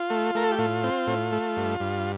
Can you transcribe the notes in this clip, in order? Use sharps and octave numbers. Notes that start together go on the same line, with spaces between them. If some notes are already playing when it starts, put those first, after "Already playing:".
Already playing: F4
A3
A3 A#4
A4
G4
A2 F4
C4
A2
A3
G2
G2